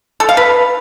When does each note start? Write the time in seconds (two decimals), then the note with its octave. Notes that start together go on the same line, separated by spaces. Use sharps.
0.20 A4
0.29 F5
0.37 B4